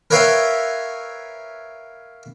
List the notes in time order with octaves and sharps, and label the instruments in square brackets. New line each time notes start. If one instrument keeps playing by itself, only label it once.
[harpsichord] A#4 B4 C#5 E5 F5 G5